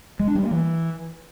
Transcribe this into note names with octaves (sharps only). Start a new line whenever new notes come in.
G#3
D4
G3
A#3
E3